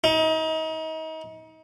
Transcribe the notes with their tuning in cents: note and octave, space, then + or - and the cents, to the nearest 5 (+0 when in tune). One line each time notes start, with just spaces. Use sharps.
D#4 +35